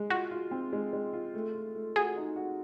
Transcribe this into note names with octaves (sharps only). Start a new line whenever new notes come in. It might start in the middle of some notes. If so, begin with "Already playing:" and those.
Already playing: G#3
F4 F#4
F4
C4
G#3
G#3
F4
A3
A3
A3
F#4 G#4
D#4
F#4